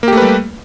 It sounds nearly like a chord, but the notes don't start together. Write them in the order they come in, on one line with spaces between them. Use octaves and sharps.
A#3 G4 A3 B4 G3